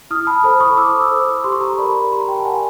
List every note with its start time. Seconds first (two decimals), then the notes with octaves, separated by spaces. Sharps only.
0.10 E4 D#6 F6
0.27 A5 B5
0.43 A4 C5 A5 B5
0.60 C#6 D#6
0.77 E4 D6 E6
1.11 A4 C5
1.44 G4 C6
1.52 C#6
1.61 A#5 C6
1.78 A#4 D5 A5 B5
2.11 G4 A#5 C6
2.28 G5
2.40 A5
2.44 A#4 D5 F#5 G#5